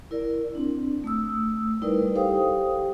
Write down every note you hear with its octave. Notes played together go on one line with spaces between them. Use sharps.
E4 A#4 D5
C4 D4
A3 D#6 E6
G3 D#4 E4 A#4 B4 D5
G4 A4 C5 F5 G5 D#6